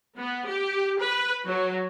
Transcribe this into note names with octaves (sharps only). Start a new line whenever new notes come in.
B3
G4
B4
F#3